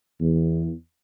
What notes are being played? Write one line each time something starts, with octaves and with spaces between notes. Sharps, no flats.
E2